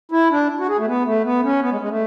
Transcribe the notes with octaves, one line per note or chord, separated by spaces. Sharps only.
E4
D4
F#4
G#4
A3
B3
A3
B3
C#4
B3
G#3
G#3
A3